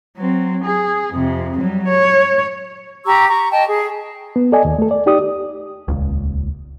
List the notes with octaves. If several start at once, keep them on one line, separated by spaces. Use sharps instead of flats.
F#3 C4
G#4
F2 C3
F#3 G3
C#5
G4 A#5 C#6 E6
A#5 C#6
D#5 G5 A5
G#4
B3
A4 D5 D#5 G#5
D#2
A3 A4
D5
D#4 G4 D5 D#6
D#1 C#2